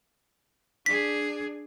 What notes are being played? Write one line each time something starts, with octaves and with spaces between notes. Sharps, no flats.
D4 G#4 B6